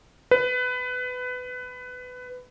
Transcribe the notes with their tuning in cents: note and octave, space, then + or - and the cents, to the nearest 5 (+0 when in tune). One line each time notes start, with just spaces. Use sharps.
B4 +20